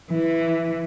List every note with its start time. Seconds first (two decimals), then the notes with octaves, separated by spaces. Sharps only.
0.11 E3